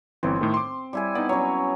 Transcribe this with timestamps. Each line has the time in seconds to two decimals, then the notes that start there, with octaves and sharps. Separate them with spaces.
0.23 G1 E3 C4
0.41 A2 D#3 A3
0.54 C6 D6
0.93 G3 E4 G#5
1.15 B3 D#4 D5
1.29 F#3 C#4 C#5